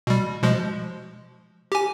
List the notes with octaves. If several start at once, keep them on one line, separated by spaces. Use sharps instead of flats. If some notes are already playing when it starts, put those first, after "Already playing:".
B2 G3
B2 F3 G#3
G4 G#5